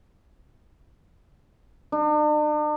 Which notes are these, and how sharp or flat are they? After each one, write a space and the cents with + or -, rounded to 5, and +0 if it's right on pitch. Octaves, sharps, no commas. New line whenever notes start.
D4 +45